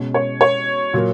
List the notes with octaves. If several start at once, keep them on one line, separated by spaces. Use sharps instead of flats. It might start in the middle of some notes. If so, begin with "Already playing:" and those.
Already playing: B2 G#3 C#4
C#5
C#5
A#2 F#3 A#3